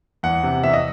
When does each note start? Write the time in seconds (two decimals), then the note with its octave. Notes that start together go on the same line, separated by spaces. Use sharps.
0.23 E2 F#5
0.43 C3
0.63 E2 E5
0.73 D#5